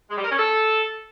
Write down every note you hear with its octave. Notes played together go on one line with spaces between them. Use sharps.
G#3
G3
A#4
C#4
A4